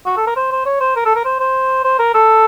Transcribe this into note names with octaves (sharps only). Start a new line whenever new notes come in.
F#4
A4
A#4
C5
C5
C#5
C5
A#4
A4
A#4
C5
C5
C5
A#4
A4